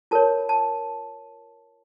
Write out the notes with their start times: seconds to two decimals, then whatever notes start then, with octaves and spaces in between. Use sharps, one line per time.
0.11 F4 A#4 C#5 A5
0.49 A5